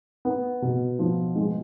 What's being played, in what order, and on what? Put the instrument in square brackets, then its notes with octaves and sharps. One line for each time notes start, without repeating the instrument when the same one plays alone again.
[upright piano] B3
B2
F3
G#3